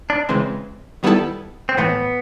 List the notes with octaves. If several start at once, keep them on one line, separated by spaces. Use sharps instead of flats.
D4
C#3 E3 G#3 C4
D#3 G3 B3 E4 A4
C4
A2 E3 A3 B3